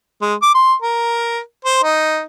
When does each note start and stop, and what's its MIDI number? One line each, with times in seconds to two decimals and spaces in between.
0.21 0.34 56
0.42 0.50 86
0.55 0.73 84
0.82 1.39 70
1.65 1.80 72
1.83 2.22 63